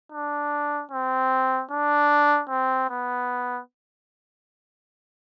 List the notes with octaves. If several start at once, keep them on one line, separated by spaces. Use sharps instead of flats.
D4
C4
D4
C4
B3